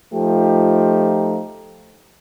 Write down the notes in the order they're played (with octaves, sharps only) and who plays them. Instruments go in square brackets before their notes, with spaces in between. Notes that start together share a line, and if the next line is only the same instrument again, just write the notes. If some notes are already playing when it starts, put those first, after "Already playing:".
[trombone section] F3 A3 D#4 F4 G4